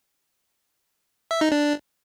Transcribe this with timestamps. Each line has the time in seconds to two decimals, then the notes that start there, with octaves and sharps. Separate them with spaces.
1.31 E5
1.41 D#4
1.52 D4